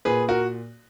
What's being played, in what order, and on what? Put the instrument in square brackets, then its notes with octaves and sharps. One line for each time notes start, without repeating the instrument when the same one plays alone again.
[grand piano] A#2 G#4 B4
F#4 A#4